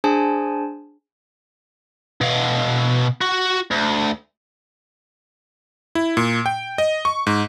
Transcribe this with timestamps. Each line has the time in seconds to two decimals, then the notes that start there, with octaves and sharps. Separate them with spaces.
0.04 D4 G#4 C5 G#5 A5
2.21 B2 F5
3.21 F#4
3.71 D2
5.95 E4
6.17 A#2
6.46 G5
6.78 D#5
7.05 C#6
7.27 G#2